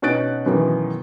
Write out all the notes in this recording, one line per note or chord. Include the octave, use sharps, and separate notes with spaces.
B2 C#4 D#4 F#6 A6 D7
F#2 B2 D#3 E3